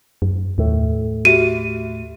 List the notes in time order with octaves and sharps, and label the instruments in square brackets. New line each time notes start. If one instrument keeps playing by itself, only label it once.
[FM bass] F#2
[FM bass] D#2 [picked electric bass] A2 A3
[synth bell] F#4 G4 E5 [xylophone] D#7